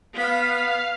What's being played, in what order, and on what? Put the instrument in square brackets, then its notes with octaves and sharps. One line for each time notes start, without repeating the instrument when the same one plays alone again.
[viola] B3 B5 [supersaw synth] F5